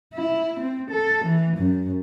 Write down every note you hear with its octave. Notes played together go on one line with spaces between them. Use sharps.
E4
C4
A4
E3
F#2